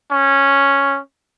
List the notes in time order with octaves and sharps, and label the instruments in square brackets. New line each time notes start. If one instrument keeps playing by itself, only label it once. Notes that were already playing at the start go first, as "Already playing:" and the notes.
[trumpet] C#4